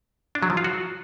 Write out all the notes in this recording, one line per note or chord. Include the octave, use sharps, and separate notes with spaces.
D4
F#3
F3
F4
F#4